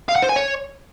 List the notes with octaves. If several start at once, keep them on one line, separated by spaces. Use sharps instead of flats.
F5
F#5
C5
G#5
C#5